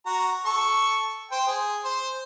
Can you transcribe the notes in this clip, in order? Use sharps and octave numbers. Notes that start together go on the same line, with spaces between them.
F#4 A#5
A4 C#6
C5 G5
G#4
C5 C6